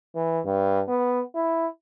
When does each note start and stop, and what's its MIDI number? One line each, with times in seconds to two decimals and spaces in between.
0.15 0.40 52
0.45 0.82 43
0.88 1.22 59
1.35 1.67 64